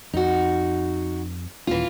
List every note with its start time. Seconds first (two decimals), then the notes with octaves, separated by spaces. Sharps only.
0.13 F2 D#4 F#4
1.67 D#1 E3 A#3 C#4 F4